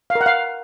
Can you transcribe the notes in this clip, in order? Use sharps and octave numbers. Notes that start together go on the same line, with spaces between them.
F5
A#4
F#5
F5